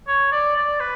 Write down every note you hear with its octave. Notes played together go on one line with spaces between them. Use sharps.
C#5
D5
D5
B4